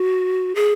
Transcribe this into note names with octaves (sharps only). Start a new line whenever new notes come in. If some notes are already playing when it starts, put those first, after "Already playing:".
Already playing: F#4
G#4